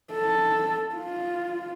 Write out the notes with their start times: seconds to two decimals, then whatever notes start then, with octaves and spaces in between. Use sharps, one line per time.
0.13 A4
0.95 F4